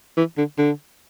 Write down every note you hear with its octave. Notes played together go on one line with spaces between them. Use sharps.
E3
D3
D3